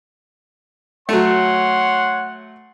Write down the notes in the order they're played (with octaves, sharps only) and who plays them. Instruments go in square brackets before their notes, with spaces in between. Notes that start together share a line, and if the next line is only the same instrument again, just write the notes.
[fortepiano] F#3 A3 [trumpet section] C#5 F#5 C6